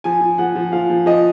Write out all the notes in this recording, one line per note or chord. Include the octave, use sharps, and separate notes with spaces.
F3 G#5
F3
F3 F#5
F3
F3 F5
F3
F3 D#5